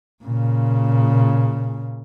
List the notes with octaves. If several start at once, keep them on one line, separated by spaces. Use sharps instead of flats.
A#2 C#3